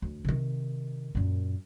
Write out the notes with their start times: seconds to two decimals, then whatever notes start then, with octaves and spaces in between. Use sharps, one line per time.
0.02 D2
0.25 C3 D#3
1.15 F#2 A#2